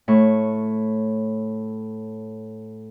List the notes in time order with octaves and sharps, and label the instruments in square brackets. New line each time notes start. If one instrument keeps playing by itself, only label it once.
[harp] A2 C#6